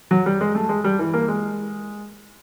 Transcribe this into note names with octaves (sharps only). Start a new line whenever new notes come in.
F#3
G3
G#3
A3
G#3
G3
E3
A#3
G#3